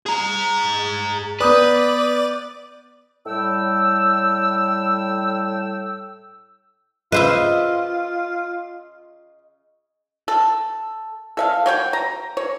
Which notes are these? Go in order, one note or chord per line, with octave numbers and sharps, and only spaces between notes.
G#4 A#5
B3 B4 D5 D#6 G6 D#7
A2 G3 C#5 G5 E6
C#3 F4 B4 C5 D#5 E5 E6
A4
A4 E5 F5
F#3 C#5 G5
A#5
C#5